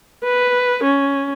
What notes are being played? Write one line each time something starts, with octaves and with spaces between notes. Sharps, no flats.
B4
C#4